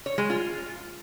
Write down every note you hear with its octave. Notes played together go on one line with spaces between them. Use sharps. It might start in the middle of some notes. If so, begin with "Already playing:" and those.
C#5
G#3
F4